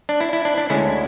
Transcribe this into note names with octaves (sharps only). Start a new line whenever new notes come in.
D4
E4
E4
D4
D4
D2 D3 G#3 C#4 E4